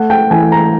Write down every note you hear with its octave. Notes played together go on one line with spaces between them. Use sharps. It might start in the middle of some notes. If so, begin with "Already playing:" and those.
Already playing: A3 F#5
G5
E3 G#5
A#5